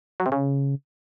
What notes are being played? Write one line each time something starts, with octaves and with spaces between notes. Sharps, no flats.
F#3
C3
C#3